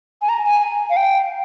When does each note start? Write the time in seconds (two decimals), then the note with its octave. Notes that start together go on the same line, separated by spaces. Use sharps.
0.22 G#5
0.29 A#5
0.46 G#5
0.90 F5
0.97 G5